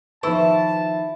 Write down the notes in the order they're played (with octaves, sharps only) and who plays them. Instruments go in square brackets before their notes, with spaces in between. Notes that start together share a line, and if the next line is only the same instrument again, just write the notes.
[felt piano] D#3 F3 [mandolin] E4 [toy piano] B4 C#6 E6 [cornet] A5